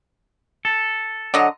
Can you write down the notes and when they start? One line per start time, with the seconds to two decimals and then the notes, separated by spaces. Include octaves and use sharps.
0.65 A4
1.34 D3 F#3 D#5